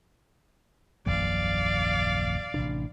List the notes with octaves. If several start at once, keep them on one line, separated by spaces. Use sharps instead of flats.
D#1 A#1 F#2 D5 F5
A1 C3 D4